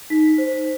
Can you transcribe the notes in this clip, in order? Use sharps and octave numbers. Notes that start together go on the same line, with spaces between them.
D#4 B6
C5